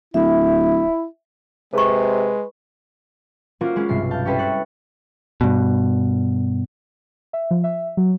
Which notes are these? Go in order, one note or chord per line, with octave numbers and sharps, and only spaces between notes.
D1 E4 E5
C3 G#3 G#4 B4 C#6
A#3 C#4 F4 F#4 A#4 C5
G#3 B3 C#4
B1 G2 C3 C7
F5 A5 G6
C#4 E4 G4 A4 B4 C5
C#6 F#6 A6
G2 B2
E5
F3
E5
F#3